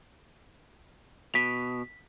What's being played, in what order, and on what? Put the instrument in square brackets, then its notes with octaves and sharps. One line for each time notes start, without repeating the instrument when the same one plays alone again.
[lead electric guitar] B2 [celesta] B6